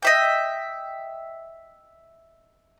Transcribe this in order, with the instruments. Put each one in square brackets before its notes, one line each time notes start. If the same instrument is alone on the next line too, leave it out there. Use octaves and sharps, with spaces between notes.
[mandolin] D#5 E5 G5